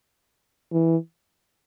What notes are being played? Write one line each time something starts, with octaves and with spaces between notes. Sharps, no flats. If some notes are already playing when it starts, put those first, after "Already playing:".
E3